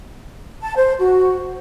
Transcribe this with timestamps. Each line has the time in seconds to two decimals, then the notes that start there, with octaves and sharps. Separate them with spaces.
0.62 A5
0.76 C5
0.99 F#4